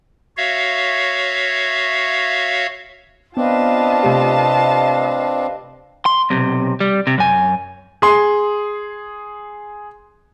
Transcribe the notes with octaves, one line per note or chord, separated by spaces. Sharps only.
F#4 C#5 E5 F5
B3 C4 D4 F4 B4 D#5 F5 A5
C3 A3 G4
C6
B1 C3
G3
C3
F#2 G#5
G#4 C6